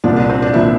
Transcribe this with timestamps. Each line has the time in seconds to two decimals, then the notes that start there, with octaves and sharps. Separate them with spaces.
0.04 C2 A#2 F3 D4
0.16 D4
0.30 C4
0.42 D4
0.54 A#2 F3 E4